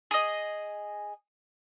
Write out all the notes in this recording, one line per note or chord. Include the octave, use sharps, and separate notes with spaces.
G#4 D#5